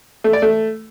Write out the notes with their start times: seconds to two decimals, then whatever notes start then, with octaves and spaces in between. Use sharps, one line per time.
0.24 A3
0.33 D5
0.42 A3